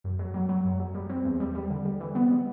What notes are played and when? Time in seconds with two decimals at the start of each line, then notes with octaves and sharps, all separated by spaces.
0.04 F#2
0.19 F#3
0.34 F#3
0.49 F#3
0.64 F#2
0.80 F#3
0.95 G3
1.10 C4
1.25 E2
1.40 G3
1.55 G3
1.70 D3
1.85 G3
2.00 E3
2.15 B3
2.30 G3